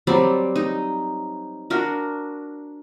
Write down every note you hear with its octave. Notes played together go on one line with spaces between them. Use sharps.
F#3 G3 C4 D5
D#4
D4 F#4 A#4